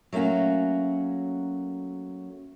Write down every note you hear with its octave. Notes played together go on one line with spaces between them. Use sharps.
F#3 A3 A#3 C#4 F#4